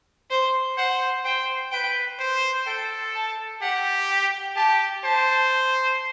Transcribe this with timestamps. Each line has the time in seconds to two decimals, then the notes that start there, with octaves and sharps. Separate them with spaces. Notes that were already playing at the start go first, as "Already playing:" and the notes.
0.30 C5
0.78 C5 F#5
1.24 C5 G5
1.72 B4 G5
2.19 C5
2.66 A4 G5
3.15 A5
3.62 G4 F#5
4.10 G5
4.56 G4 A5
5.03 C5 A5